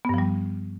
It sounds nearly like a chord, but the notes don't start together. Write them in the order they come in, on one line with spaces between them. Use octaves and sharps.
B3 G2 F3 G3